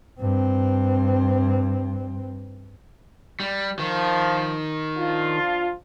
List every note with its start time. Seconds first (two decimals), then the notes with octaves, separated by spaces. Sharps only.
0.21 G2 C4
3.40 G3
3.79 D#3 F3
4.98 F3 D4 F4